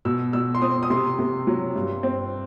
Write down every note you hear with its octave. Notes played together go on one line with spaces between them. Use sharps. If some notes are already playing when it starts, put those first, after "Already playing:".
B2 E6
B2 E6
C6
C4 D#6
D#6
C3 C6
C3
F#3
G2
C4